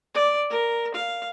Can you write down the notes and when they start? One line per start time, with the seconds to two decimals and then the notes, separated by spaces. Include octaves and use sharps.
0.15 D5
0.50 A#4
0.94 F5